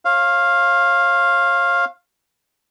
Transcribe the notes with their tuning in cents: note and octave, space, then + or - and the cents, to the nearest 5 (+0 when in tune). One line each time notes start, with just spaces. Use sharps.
C#5 -45 F5 +0